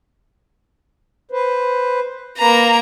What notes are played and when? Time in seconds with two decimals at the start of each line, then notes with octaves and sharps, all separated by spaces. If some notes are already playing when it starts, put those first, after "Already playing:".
1.31 B4 C5
2.38 A#3 B4 A#5